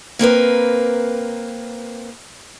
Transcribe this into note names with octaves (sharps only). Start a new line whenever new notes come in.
A#3 C4 A#4 B4